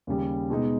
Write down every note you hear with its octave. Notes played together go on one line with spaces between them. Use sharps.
D#2 C#3 G3
B2 G#3 D#4